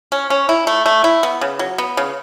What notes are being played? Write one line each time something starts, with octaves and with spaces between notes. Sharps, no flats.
C#4
C#4
E4
A3
A3
E4
B3
C#3
F#3
B3
C#3